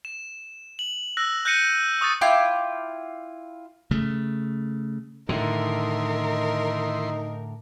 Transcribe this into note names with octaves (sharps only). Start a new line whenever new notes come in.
E7
F#7
E6 F#6 A#6
F#6 G6 A#6 C#7 D#7
C#6 D#6 F#6 A6
E4 F4 G5 D6
C#3 A3
A2 D3 D#3 D#4 E4 A#4 C6